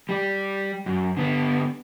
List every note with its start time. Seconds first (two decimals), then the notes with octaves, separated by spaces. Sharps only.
0.09 G3 G4
0.86 F#2
1.17 D3 B3